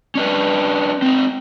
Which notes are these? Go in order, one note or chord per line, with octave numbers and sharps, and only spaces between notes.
C#4 D4 B4
C4 D#4